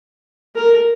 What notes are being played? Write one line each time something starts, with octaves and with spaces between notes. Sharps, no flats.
A#4